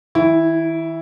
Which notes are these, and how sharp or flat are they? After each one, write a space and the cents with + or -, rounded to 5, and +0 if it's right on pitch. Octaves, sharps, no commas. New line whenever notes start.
D#3 +45 E4 +0